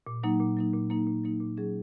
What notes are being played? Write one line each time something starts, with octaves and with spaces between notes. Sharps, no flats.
A#2
F#3 A#3 D#4
A#2
F#3 A#3 D#4
A#2
F#3 A#3 D#4
A#2
F#3 A#3 D#4
A#2
F#3 C#4 G#4